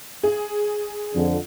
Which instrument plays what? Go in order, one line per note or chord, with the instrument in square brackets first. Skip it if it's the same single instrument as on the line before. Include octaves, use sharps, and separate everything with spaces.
[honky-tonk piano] G#4
[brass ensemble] F2 D3